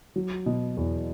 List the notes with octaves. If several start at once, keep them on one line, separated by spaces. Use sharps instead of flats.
F#3
B2
E2